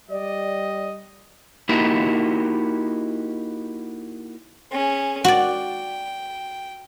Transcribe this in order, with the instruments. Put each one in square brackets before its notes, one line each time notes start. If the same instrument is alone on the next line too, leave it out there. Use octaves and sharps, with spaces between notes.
[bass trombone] G3 [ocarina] D5 [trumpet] D#5
[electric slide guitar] A#3 D#4 E4 F#4 G4
[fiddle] C#4 G#4
[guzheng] F#4 D5 [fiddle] G5